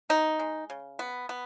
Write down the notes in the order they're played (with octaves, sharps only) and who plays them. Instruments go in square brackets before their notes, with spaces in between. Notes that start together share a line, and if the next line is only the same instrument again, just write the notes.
[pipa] B3 D#4
G#3
C#3
B3
B3